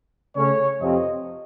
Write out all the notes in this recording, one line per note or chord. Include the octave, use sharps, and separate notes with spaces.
C#3 A3 C#4 C#5
F2 C3 F3 C4 D#5